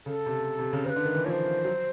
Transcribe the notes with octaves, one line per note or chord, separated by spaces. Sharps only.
C#3 A4
C3
C3
C#3
C#3 C5
B4
D3
D#3
E3
F3 C5 C#5
F#3